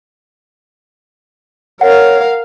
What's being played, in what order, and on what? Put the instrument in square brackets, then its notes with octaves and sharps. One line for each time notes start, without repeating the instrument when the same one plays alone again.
[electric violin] A#4 F5 [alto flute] C#5 [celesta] F#5